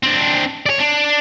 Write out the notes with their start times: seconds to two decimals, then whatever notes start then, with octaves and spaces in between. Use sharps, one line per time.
0.03 C4 D4
0.66 C#5 D5
0.79 D4